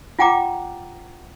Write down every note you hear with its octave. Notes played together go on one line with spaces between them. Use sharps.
F4 F#5 G5 A#5 D6